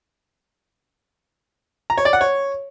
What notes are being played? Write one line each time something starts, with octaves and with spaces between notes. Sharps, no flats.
A#5
C#5
D5
F#5
C#5